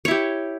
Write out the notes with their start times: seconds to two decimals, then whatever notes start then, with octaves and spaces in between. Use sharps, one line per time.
0.05 C#5
0.08 E4
0.11 G4